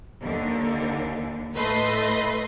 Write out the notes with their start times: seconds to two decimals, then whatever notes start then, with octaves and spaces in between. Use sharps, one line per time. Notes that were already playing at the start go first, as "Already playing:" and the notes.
0.22 D#2 D3
1.54 A2 A3 B4 D#5 C6